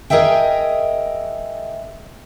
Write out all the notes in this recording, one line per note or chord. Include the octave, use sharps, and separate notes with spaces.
G#4 A#4 D#5 E5 G5